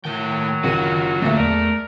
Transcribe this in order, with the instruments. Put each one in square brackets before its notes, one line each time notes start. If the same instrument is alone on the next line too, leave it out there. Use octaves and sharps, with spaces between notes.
[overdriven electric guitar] A2 G5 [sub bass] D#3 [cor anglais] F#3
[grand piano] F#1 D#7 [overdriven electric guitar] F4 F#4
[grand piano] D1 A#3 E5 [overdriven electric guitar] A3
[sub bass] E2 [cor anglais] A#4 [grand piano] D5